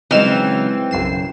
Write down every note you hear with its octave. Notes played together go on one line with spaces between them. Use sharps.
C#3 E3 F#3 G#3 C4 D#4 F6 E7
B1 F#2 C#3 C7 E7